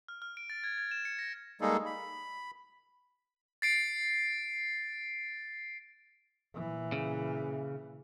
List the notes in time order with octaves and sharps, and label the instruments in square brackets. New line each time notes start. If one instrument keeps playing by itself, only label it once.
[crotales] F6
F6
D7
A6
G#6
G#6
E7
C#7
A#6
[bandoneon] G3 G#3 A#3 D#4 G#4 A4
B5
[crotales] A6 C7 D7
[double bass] A#2 E3
[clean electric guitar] C#3